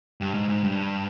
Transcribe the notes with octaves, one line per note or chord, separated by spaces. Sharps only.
G2
G#2
G#2
G2